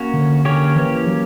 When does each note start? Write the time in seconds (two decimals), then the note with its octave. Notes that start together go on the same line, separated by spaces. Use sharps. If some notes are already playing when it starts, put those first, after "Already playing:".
Already playing: A#3 C#4 F#4 C#5
0.13 D3
0.45 D3 A#3 C#4 G4 C#5
0.75 E3
1.06 F#3